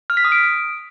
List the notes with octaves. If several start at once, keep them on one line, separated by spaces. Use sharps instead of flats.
F6
B6
D#6
D7